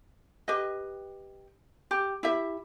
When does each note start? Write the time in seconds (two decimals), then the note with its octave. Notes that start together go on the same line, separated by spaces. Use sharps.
0.48 G4 B4 D#5
1.91 G4
2.23 E4 G4 E5